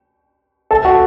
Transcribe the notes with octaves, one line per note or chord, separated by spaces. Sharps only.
A4
F#4